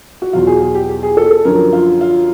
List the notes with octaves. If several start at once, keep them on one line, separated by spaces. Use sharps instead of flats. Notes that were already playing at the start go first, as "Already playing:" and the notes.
F#4
E2 B2 F#3 F4
G#4
G#4
G4
G4
G#4
A4
A4
F#2 D3 F3 A#4
F4
F4